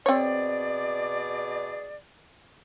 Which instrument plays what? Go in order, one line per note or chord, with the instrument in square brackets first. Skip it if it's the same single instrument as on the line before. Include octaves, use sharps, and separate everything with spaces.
[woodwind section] B2 G#4 D5 [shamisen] C4 C#5